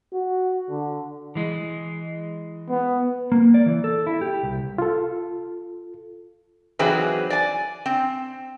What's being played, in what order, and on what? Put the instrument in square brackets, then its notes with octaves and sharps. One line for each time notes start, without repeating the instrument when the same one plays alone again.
[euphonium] F#4
D3
[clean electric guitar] E3 G#3
[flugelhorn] B3
[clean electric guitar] A#3
D5
E3
A4
E4
G4
C2
[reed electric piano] F4 A4
[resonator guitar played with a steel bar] E3 F#3 C4 D#4 G#4 B4
D5 G#5
C4